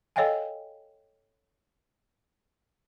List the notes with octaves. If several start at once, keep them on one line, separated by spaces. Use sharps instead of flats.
A4 C#5 D#5 F5 G5 G#5